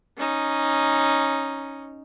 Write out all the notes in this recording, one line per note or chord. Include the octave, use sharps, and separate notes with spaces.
C#4 D#4